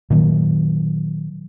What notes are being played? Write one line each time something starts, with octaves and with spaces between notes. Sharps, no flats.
A#2 D#3 F#3